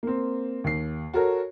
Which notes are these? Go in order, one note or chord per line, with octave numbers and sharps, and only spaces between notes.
A#3 C4
D#2 C7
F#4 A4 A#4 C#5